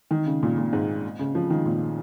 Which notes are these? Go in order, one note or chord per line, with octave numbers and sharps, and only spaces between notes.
D#3
C#3
A#2
A#2
G#2
C#3
F3
D#3
A#2